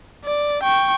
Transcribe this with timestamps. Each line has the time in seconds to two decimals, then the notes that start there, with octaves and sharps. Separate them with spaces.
0.25 D5
0.64 G5 C#6